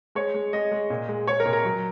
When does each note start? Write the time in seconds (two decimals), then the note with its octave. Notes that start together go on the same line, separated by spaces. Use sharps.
0.15 G#3 C#5
0.34 G#3
0.53 G#3 D#5
0.72 G#3
0.90 A#2
1.09 G#3
1.27 G#3 C#5
1.40 A#4
1.45 A#2
1.53 A#4
1.65 F#3